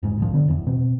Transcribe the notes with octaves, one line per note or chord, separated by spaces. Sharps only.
F1 G#2
F1 B1 F3
D3 B3
F1 E2
B2 C4